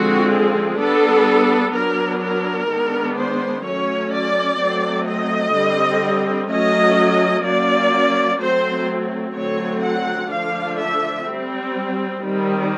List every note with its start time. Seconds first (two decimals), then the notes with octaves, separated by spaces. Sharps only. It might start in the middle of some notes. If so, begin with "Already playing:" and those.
Already playing: D3 F3 G#3 C4 F#4
0.31 G#4
0.79 G3 B3 D4 A4
1.73 F#3 B3 D4 A#4
2.22 A#4
2.69 D#3 G#3 B3 D4
3.17 C5
3.64 F#3 A3 C#4 C#5
4.12 D5
4.60 F#3 A3 C4
5.07 D#5
5.54 D3 G3 C4
6.49 F#3 A3 C#4 D#5
7.44 F#3 A#3 C#4 D5
8.40 F#3 A3 C4 C5
9.35 D3 F#3 A3 C4 C#5
9.82 F#5
10.30 D3 F3 A3 D4 F5
10.78 E5
11.26 G3 C4
12.21 D#3 G3 C4